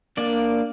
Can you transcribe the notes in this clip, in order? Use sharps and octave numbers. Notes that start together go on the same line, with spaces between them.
A#3 D4 D5